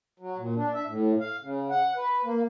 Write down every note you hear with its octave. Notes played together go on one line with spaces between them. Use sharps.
F#3
A#2
D4
E5
A2
F5
C#3
F#5
B4
A#3